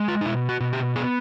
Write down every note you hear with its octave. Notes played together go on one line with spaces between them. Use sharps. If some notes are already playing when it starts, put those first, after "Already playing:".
Already playing: G#3
F4
D#4
B2 E4
F#4
B2
G4
B3 G#4